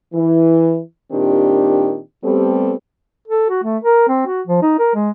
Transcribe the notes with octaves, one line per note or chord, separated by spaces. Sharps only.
E3
A#2 D#3 C4 D4 G4
G3 A3 B3 C4 G4 A4
A4
F#4
A3
A#4
C4
F#4
F3
D#4
A#4
G#3